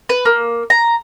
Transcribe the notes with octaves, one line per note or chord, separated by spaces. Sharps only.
B4
A#3
A#5